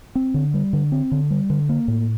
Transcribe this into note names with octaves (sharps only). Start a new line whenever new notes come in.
C4
D3
G3
D3
C4
D3
G3
D3
A#3
A2